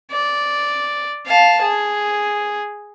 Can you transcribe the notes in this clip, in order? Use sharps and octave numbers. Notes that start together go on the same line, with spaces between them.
D5
F5 A5
G#4